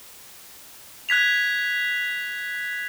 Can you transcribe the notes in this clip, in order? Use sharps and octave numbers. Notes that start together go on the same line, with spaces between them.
F#6 G#6 B6 F7